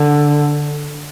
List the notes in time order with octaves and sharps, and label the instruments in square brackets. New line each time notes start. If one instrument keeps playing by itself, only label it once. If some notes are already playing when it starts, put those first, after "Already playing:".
Already playing: [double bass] D3